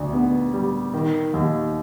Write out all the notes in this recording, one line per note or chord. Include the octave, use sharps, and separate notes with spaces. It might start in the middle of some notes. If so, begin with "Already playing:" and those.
Already playing: D2
B3
G3
D#3
D#2